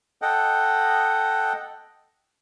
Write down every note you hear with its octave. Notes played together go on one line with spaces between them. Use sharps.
A4 D#5 F#5 G5